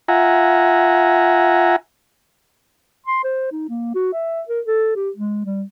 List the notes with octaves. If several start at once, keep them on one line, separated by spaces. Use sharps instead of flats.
F4 E5 F#5 G#5 A#5
C6
C5
D#4
A#3
F#4
E5
A#4
A4
G4
G#3
G3